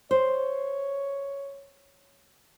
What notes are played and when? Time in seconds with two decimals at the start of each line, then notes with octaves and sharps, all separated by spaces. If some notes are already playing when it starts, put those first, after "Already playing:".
0.11 C5 C#5